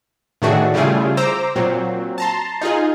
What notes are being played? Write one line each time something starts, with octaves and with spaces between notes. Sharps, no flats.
A2 D#3 A3 D4 F#4 G#4
C#3 G3 A3 E4 F4 G#4
C5 A#5 D6 E6
A#2 F#3 C4
A5 A#5 C6
D#4 F4 G#4